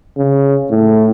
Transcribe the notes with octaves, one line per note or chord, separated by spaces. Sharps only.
C#3
A2